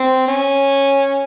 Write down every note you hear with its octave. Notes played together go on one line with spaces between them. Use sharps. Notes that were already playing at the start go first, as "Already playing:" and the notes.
Already playing: C4
C#4